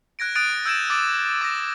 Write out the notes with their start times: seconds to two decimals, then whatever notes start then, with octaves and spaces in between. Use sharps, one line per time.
0.19 F#6 G#6 A#6 D7
0.35 D#6 F#6 A6 D7 D#7
0.66 E6 G6 G#6 D7 E7
0.90 D6 D#6 A6 D7 D#7
1.41 D6 A6 A#6